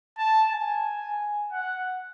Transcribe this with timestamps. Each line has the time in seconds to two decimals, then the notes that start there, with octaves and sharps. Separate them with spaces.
0.18 A5
0.51 G#5
1.52 F#5